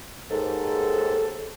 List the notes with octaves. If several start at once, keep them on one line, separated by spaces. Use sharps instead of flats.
D#2 G#2 A4